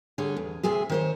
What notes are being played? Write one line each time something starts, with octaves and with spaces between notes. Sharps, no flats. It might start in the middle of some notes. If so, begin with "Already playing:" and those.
D3 G3 G#4 C#5
E2
D2 C3 C4 G#4 E5
D#3 C5 C#5